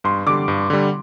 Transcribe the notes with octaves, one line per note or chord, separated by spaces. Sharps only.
G2 C6
D3 G3 D6
G2
D3 G3